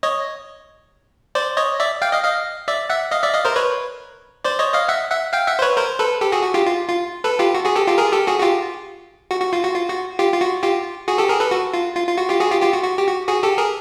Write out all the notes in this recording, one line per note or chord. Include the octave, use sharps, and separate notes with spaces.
C#5 D#5
C5 D5
C#5 D#5
D5 E5
F5 G5
D#5 F5
D#5 F5
D5 E5
E5 F#5
D#5 F5
D5 E5
D#5 F5
A#4 C5
B4 C#5
C5 D5
C#5 D#5
D#5 F5
E5 F#5
E5 F#5
F5 G5
E5 F#5
C5
B4 C#5
A#4 C5
A4 B4
G4 A4
F#4 G#4
F#4
F4 G4
F4
F4
A4 B4
F4 G4
F#4
F#4 G#4
G4 A4
F4 G4
G#4 A#4
G4 A4
F#4 G#4
F#4
F4 G4
F#4
F#4
F4
F#4
F4
F#4
F4 G4
F4
F#4
F4 G4
F#4 G#4
G4 A4
G#4 A#4
A4 B4
F#4
F4
F4
F4
F#4
F4 G4
F#4 G#4
F4 G4
F4 G4
F#4
F#4
G4
F#4
F#4 G#4
G4 A4
G#4 A#4